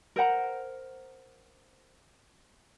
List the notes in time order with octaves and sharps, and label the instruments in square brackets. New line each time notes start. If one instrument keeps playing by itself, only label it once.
[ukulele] A#4 C5 F#5 A#5